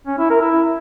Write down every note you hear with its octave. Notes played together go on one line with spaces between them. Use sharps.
C#4
E4
A#4
E4